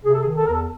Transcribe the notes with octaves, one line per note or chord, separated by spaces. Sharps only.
C3 G#4
A4
G#4
D#3
A4
A#4
E2 A4